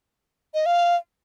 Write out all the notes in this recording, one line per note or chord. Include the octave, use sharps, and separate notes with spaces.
D#5
F5